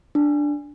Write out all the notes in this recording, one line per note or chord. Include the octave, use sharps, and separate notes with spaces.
D4